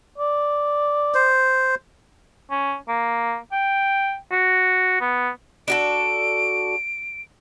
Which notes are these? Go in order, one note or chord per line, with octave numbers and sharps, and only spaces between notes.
D5
C5
C#4
A#3
G5
F#4
B3
D4 F#4 A4 D7